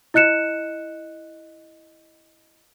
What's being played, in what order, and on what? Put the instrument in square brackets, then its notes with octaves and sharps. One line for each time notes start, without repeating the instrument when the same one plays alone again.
[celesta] E4 D#5 F#6 C#7 E7